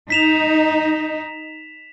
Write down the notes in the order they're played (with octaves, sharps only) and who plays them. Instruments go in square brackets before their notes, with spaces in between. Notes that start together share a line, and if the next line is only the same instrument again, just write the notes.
[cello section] D#4 [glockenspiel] B6 E7 F7